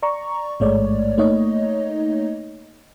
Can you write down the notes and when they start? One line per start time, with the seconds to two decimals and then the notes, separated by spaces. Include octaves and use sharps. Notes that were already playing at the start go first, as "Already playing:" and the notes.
0.02 D5 A#5 C#6
0.60 A1 G#2 G#3 A3 C#5 D5
1.18 A3 A#3 D#4 C#5 D#5